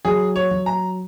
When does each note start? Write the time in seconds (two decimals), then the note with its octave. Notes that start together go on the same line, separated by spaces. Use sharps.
0.05 F#3 G#4
0.36 C#5
0.51 F#3
0.66 A#5